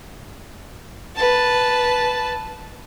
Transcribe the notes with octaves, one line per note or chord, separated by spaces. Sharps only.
B4 A5